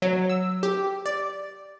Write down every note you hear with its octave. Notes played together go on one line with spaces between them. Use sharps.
F#3
E6
G4
D5